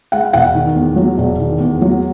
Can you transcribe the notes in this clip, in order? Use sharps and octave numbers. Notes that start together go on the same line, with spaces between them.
G#3 F#5
E1 F#5
D#3
E2
F#3
E1
D#3
E2
F#3